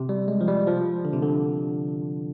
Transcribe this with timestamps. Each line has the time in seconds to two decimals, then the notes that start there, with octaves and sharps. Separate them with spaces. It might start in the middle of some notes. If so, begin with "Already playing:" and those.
Already playing: C3
0.09 G3
0.28 G#3
0.41 F3
0.48 G3
0.67 F3
1.05 D3
1.13 C3
1.23 D3